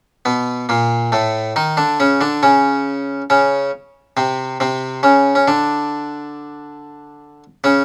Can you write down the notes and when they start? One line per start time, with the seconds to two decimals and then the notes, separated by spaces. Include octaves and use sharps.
0.25 B2 B3
0.69 A#2 A#3
1.12 A2 A3
1.56 D#3 D#4
1.77 D3 D4
2.00 C#3 C#4
2.21 D3 D4
2.43 C#3 C#4
3.30 C#3 C#4
4.17 C3 C4
4.60 C3 C4
5.03 C#3 C#4
5.35 C#4
5.48 D3 D4
7.64 C#3 C#4